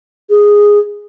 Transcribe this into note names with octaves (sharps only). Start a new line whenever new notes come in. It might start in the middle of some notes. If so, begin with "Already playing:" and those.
G#4